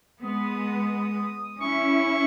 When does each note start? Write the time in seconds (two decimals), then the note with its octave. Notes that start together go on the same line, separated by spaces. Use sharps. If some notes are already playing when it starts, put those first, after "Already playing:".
0.22 G#3 B3 D#6
1.61 C#4 E4 C#6